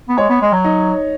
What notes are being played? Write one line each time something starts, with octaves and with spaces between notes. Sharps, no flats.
B3
G#3 C#5
B3
G#3
F#3
D#4